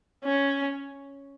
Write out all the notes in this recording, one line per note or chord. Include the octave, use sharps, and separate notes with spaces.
C#4